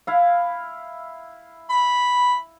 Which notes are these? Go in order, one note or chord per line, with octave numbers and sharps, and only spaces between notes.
E4 F5
B5